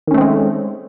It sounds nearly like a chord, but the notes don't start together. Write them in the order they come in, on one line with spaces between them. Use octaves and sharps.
D#3 C#4 A3 C4 G#3